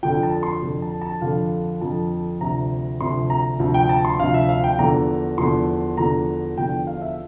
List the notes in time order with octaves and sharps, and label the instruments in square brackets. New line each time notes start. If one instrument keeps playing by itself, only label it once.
[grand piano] F2 D3 F3 G5
A5
C6
F2 D3 F3
A5
A5
F2 D3 F3 F5
F2 D3 F3 A5
D2 C3 F3 A#5
D2 C3 F3 C6
A#5
D2 C3 F3
G5
A5
C6
D2 C3 F3 F5
E5
F5
G5
E2 D3 F3 A#5
E2 D3 F3 C6
E2 D3 F3 A#5
E2 D3 F3 G5
F5
E5